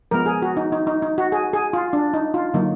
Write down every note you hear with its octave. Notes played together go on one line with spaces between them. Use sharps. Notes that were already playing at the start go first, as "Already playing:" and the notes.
F3 G#3 B3 A#4
G#4
F#4
D#4
D#4
D#4
D#4
F#4
G#4
G#4
F4
D4
D#4
F4
D3 F#3 A#3 D#4